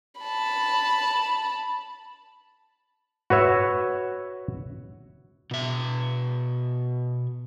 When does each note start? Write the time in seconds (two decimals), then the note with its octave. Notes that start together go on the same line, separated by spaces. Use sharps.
0.21 A5 B5
3.30 F#4 B4 C#5 E5
5.51 B2 E5